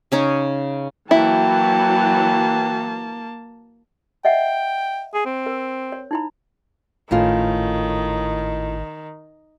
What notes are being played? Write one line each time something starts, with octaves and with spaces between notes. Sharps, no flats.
C#3 C#4 D#4
E3 F#3 A#3 E4 F#4 G5 A5
D#5 E5 F#5 G5
G#4
C4
A#4
C#5
D#4 E4 B5
G#1 A2 D#3 C#4 F4